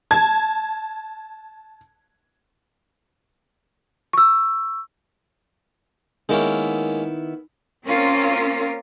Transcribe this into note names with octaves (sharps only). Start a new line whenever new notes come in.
A5 G#6
C#6 E6
D#3 G#3 A#3 B3 C#4 E4
A#3 C4 C#4 F4 A#4